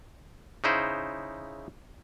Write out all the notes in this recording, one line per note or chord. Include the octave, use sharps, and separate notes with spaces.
C#3 D#4 E4 C5